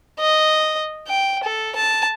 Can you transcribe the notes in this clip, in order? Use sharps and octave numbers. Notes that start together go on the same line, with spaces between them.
D#5
G5
A4
A5